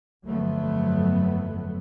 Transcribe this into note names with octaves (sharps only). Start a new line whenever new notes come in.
G1 F2 F#3 A3 B3